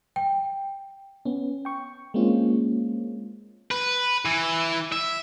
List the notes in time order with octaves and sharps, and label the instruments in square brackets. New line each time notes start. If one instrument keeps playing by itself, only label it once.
[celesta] G5
[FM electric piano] B3 C#4
G5 C#6
G#3 A#3 C4 C#4 F4
[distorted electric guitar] B4
E3
E5